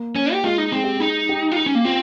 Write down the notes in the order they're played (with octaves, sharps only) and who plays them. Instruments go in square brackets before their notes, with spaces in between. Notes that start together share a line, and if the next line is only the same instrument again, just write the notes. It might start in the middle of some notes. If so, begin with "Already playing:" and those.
Already playing: [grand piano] A#3
[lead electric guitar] C#4
G4
[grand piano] G#3 [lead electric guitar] F4
[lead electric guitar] D#4
[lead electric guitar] C4 [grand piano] G#4
[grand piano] G4
[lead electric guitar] D#4 [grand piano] G#4
[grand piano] G4
[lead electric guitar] F4
D#4
C#4
A#3
[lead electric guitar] C4 [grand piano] F4